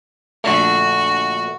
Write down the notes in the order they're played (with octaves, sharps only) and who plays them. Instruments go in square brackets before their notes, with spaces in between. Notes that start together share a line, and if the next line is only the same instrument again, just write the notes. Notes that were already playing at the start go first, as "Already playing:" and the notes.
[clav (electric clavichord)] A#1 D3 A3 [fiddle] F#4